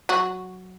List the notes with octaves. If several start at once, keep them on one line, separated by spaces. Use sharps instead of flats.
F#3 F#4